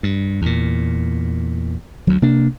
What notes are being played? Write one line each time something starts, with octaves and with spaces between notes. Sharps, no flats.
G2
E2 A#2
D2 F#3
C3 A#3 D4